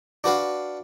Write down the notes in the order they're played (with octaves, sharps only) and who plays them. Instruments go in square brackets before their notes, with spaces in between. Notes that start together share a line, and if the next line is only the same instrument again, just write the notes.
[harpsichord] D4 F#4 B4 F5